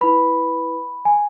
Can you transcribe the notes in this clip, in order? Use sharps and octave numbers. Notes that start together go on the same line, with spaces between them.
E4 B4 B5
G#5